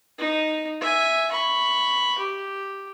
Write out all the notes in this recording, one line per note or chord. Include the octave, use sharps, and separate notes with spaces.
D#4
E5 G#5
B5 C#6
G4